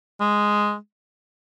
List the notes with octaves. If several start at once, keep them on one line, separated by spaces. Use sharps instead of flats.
G#3